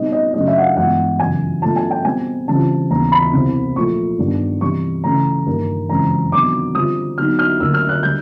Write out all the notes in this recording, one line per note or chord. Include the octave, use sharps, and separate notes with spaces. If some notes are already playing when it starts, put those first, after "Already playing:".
Already playing: B2 G3 C4 D#4 D#5
D#5
F#2 C#3 F#3 A3 D4 D#5
E5
F#5
F5
G2 E3 G#3 B3 E4 F#5
F#2 C#3 E3 G#5
B2 F#3 A3 D4 F4 A5
G#5
G5
B2 G3 C4 G#5
C#3 E3 G3 C4 F4 A5
D#2 C#3 E3 G3 B3 A#5
B5
C2 B2 G3 C4 E4
A#2 F3 A3 C#6
G2 D#3 G3 B3 D4
C3 E3 G3 C#6
C#3 E3 A3 A#5
G2 D#3 G3 A#3
F#2 C#3 E3 G#3 C4 A#5
C3 D#3 F#3 B3 D4 D6
D3 G3 C4 F4 D#6
D3 F#3 B3 D#4 F6
F6
D2 D3 F#3 A#3 E6
F6
F#6
D3 G3 G6